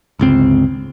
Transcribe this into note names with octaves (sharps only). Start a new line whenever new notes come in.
G1 C#2 C4